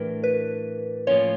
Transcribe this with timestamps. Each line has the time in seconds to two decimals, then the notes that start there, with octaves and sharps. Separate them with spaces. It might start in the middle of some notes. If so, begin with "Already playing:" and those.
Already playing: A2 E3 A3 D4 G4 A#4 B4
0.24 B4
1.07 A2 F3 A#3 C#4 F4 C#5